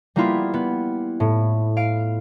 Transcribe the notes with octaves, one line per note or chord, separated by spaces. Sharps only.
G3 A#3 B3 E4 F4
B3
A2
F5 D7